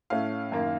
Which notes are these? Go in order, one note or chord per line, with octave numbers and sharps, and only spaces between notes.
A2 A3 C#4 F5
F#2 D#3 A#3